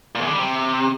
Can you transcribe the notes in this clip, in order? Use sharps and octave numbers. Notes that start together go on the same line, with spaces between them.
A#2
E2
D3
G3
C3